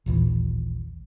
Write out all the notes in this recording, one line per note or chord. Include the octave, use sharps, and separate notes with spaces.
A1 D#2 A#2 E3